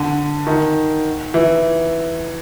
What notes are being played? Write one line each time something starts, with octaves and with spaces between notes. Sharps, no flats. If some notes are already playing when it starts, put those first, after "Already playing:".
Already playing: D3
D#3
E3